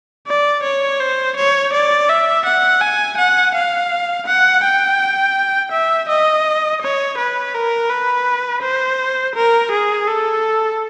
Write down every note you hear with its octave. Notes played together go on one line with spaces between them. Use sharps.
D5
C#5
C5
C#5
D5
E5
F#5
G#5
F#5
F5
F#5
G5
E5
D#5
C#5
B4
A#4
B4
C5
A#4
G#4
A4